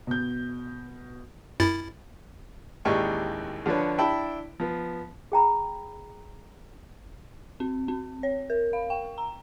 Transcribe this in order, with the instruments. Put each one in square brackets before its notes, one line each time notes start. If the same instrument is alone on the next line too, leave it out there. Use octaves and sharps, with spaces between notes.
[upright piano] B2 G6
[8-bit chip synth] F#2 E4 A6
[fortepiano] A1 D#2 G#3 G4 D5 C#6
D3 F3 D4 B4 C#5
D4 E4 G5 A5 B5
F3 B3
[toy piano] G#4 G5 A#5 B5
[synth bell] C4
C4
C#5
A#4
F5
G5
A#5